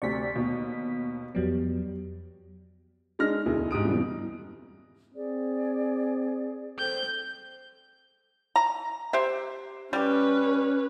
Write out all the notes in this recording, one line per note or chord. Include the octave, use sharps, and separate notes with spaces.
D2 C3 D5 C#6 B6
D#2 B2
F2 F#3 G3 B3
G#3 D4 D#4 F6 A#6
E1 D2 E4 G#4
G#2 G4 D#6 D7
F2 B2 E3 G3
C4 G#4 D5
A4 C5 G5 G6
A#5
G4 C5 E5
G3 C#4 G4 B4